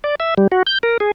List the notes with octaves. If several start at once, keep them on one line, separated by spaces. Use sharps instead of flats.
D5
E5
G3
F#4
G6
A#4
G#4